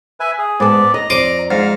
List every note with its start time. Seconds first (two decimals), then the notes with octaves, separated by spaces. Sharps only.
0.20 B4 E5 G#5
0.38 G#4
0.60 G#2 B3 A4 D5 A5
0.94 D#5 A#5
1.10 F2 D5 C6 D6 D#6
1.51 G#2 F5 A#5